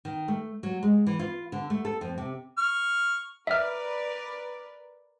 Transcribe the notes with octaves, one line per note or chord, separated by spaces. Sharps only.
D#3
A3
F#3
G#3
E3
F4
D3
A3
A4
F2
C3
C#6 F6
A#4 B4 D5 E5 F6